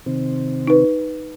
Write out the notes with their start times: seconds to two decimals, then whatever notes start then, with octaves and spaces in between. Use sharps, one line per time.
0.06 C3 D#3 C4
0.68 D#4 B4